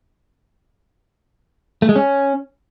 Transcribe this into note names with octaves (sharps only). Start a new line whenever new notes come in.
A3
G#3
C#4